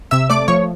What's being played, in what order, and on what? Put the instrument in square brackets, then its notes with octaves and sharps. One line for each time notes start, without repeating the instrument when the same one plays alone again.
[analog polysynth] C3 E5 E6
A3 D5 D6
F3 C#5 C#6